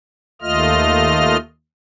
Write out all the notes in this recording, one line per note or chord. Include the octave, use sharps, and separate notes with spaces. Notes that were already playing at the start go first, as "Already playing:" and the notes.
D#2 A3 F4 D#5 F6